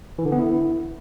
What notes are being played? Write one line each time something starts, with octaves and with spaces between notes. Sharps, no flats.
E3
D3
B3
E4